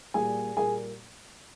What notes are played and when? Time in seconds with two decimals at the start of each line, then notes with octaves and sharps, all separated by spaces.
0.14 A#2 G3 A#3 G#4 G#5
0.57 A#2 G3 A#3 G#4 G#5